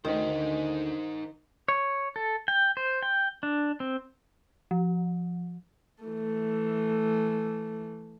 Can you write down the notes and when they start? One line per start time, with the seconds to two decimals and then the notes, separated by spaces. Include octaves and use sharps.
0.05 D2 D#3 D#4 C5
1.68 C#5
2.16 A4
2.48 G5
2.77 C5
3.03 G5
3.43 D4
3.80 C4
4.71 F3
6.03 E3 A3